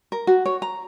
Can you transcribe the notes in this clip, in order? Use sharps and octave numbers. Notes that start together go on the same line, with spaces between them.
A#4
F#4
C#5
A#5